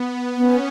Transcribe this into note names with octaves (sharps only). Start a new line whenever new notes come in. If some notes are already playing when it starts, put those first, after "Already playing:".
Already playing: B3
B3 C#4